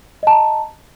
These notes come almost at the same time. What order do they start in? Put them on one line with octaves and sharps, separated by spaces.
D#5 A5 A#5